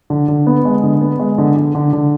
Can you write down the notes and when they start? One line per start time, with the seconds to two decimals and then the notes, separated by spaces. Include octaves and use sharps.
0.10 D3
0.28 D3
0.47 B3
0.65 G#3
0.83 D3
1.01 B3
1.19 G#3
1.38 D3
1.56 D3
1.75 D3
1.93 D3